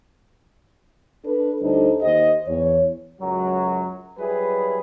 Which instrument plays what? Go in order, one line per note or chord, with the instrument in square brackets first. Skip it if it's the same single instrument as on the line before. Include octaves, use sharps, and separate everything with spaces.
[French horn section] D4 A4 B4
D2 G3 D4 D#4 A4 C5
D#2 G4 C5 D#5
E2 C#5
[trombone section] C#2 F#2 F#3
F#3 G3 E4 G#4 B4